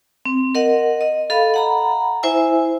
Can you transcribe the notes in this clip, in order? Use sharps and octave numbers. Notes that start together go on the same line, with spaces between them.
C4
A#4 D#5 F#5
D#5
A4 D#5 F5 B5
F#5 A#5 B5
E4 C5 E5 G#5 E6